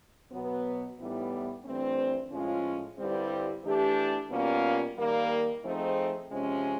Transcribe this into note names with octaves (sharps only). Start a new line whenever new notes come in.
B2 F#3 B3
A2 E3 G3 B3 D#4
G2 E3 A3 C4
A2 F3 G#3 C#4 F4
G2 D3 G3 C4 E4
E3 A3 D4 G4
B2 G3 A#3 C#4 F4
D#3 G3 A#3
F3 A3 C4 D#4 G#4
C3 F3 G#3 C#4